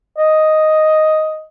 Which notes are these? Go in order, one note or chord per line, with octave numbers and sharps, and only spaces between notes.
D#5